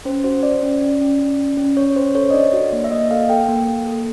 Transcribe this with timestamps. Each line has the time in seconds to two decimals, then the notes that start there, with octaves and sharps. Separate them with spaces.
0.05 C#4 C5
0.24 F#4 C5
0.43 F#4 D5
0.63 C#4
0.81 C#4
1.01 C#4
1.19 C#4
1.39 C#4
1.57 C#4
1.77 C#4 C#5
1.96 C#4 C5
2.15 A4 C#5
2.31 D#5
2.34 D4 D5
2.53 F#4
2.73 A#3
2.84 E5
2.91 A#3 D#5
3.11 A4 F5
3.29 A4 G5
3.49 A#3
3.67 A#3
3.87 A4